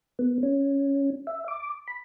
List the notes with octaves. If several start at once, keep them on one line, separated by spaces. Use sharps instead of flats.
B3
C#4
E5
D6
B5